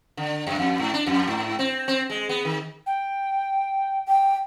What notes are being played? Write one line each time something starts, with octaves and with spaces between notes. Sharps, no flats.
D3
F#2
F2
G#2
D4
F2
G#2
C4
C4
G#3
B3
D#3
G5
G5